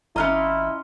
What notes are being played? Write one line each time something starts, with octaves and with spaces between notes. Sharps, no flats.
G#1 C#4 E4 F4 D#5 A#5 F6 F#6